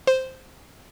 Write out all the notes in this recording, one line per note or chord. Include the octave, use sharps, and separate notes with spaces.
C5